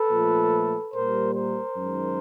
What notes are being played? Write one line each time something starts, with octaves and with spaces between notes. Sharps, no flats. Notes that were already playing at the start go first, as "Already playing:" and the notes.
Already playing: A4 B4
A#2 F3 A3
A#2 G3 A#3 A#4 C5
A#4 C5
F#2 D#3 G#3